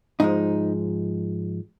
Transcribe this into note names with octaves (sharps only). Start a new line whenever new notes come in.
G#2 F3 G#3 D#4